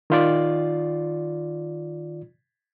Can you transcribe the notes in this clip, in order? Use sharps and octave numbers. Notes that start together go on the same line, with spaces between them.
D#3 F4 D5